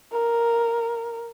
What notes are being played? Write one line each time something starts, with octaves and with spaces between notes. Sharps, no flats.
A#4